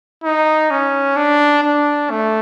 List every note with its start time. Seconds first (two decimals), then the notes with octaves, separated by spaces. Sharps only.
0.24 D#4
0.71 C#4
1.17 D4
1.63 D4
2.10 A3